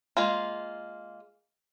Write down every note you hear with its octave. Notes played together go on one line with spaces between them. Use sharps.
G#3 A#3 F4